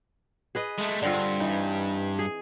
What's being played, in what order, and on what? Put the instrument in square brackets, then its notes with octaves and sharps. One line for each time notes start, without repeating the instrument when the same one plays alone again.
[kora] G#4 B4 D#5
[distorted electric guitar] G#3 A3
[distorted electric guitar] G2 [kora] D3 C4 F4
[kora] E3 D#4
G#4